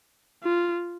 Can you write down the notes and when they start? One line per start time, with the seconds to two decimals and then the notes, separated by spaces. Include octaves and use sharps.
0.43 F4